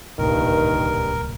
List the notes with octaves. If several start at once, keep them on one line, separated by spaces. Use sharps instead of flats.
D1 C2 G2 A#2 D#3 A#4